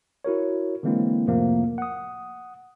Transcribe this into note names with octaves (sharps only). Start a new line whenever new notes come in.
E4 F#4 A#4 C#5
D3 E3 G#3 A#3 C4 E4
F2 A2 C3 F3 A3 A#3
F#5 D#6